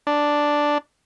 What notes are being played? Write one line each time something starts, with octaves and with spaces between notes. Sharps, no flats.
D4